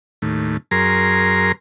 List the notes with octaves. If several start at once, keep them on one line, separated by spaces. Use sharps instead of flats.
D#2 A2
F#2 G#4 A#4 A#5 C6